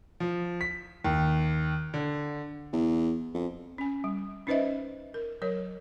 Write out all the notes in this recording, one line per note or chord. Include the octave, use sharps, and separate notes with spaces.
F3
B6
D#2
D3
E2
F2
C#4 G#5
G3
C#4 D#4 B4 C5 D#5 E5
A#4
F#3 A#4 C#5